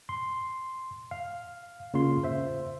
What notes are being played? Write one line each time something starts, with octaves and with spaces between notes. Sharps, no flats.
C6
F5
C#3 A#3 F4 C6
C5 E5